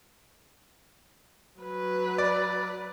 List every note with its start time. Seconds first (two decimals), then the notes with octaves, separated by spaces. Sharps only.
1.60 F#3 B4
2.18 D5